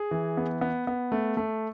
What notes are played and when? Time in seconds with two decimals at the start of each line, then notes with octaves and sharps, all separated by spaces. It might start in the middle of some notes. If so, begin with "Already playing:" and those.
Already playing: G#4
0.11 E3
0.37 B3
0.61 B3
0.87 B3
1.12 A3
1.37 A3